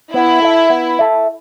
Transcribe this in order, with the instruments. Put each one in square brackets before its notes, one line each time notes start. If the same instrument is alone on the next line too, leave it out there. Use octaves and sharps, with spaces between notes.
[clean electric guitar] B3 [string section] E4
[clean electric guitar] A4 E5
B3
A4 E5